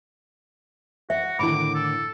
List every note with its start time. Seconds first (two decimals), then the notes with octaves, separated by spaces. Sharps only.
1.10 F#4 E5 F#5
1.39 A2 D3 D#3 E4 B5 D6
1.74 A4